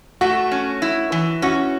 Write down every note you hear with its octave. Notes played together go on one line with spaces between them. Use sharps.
A3 F#4
C#4
E4
E3
C#4 F#4